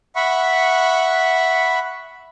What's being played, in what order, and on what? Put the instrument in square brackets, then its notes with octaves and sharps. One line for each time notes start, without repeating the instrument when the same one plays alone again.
[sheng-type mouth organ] E5 F#5 B5 C#6